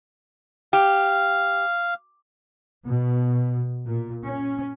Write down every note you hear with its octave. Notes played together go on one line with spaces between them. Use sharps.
G4 F5
B2
A#2
C#4